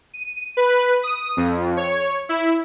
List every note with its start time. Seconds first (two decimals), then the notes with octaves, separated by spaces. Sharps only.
0.14 D#7
0.57 B4
1.03 D#6
1.37 F2
1.77 C#5
2.29 E4